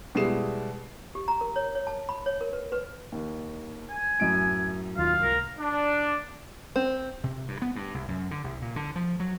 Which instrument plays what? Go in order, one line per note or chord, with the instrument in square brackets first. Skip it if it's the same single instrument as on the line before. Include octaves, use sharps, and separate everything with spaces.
[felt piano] B2 G3 G#3 E4 C7 E7
[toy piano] G4
A#5
A#4
C#5
C#5
A5
B5
C#5
A#4
B4
B4
[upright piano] D#2
[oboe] G#5
[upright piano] F#2 A2 D7
[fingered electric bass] D#2 [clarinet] F4 [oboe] F5
[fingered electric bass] C2 [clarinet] A#4
[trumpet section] D4
[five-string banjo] C4
[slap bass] C3
G2
B3
G2
C2
F#2
D3
C2
A#2
D3
F3
F#3